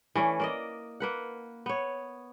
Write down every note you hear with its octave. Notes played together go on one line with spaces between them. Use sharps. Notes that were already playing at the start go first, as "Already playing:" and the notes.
E3 A3 C#4 D5
A#3 D5 D#5
A#3 B4 F#5
B3 C#5